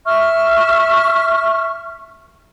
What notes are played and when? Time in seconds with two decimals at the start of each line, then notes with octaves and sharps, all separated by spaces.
0.05 E5 C#6 F6